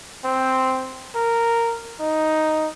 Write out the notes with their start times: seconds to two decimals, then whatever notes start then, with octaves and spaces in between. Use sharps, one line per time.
0.25 C4
1.15 A#4
2.00 D#4